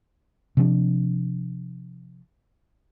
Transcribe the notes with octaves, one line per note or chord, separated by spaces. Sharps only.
C3 F3 D4